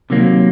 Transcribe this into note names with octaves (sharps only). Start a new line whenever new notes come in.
C3 D#3 F#3 A#3